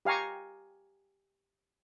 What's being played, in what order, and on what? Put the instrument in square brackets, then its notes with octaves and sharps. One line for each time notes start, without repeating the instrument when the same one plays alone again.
[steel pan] G4 F5 G#5 A#5 C#6